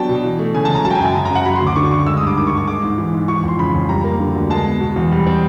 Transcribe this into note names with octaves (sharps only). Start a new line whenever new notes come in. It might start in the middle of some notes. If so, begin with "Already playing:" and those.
Already playing: F#3 B3 D4 G5 A5
B2
E3
A3
C#3 G#5
A5
C#2
A#5
F#3 A5
G5
G#5
F#2
A5
C#3 A#5
A#5
F#2
F#5
F#3 B5
C6
D2
D6
D3 C#6
D2 C#6
G#3 E6
D#6
G2 D6
D#3 D6
C#6
G2
C#6
G#3 D6
G#2
E3
G#2
E3 C#6
F2 C6
C#3 B5
F2
G3 A#5
A#3
D3
D2
G#3 A5
B3
B2
E2
G3
C4